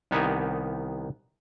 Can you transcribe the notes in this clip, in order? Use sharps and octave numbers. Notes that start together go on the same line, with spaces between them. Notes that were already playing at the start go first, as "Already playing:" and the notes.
C2 D#3 B3 D#4 G4 G#5